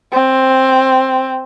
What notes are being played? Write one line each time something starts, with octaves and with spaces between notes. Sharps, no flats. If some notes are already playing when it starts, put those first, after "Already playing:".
C4